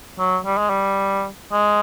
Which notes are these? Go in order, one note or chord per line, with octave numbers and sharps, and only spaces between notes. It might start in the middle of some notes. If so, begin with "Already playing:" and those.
F#3
G3
G#3
G3
G#3